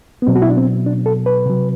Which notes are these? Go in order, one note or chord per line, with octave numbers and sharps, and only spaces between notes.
B3
B2 F#3 C4
F#4
E4
D4
C4
D4
A4
B4
C3 F#3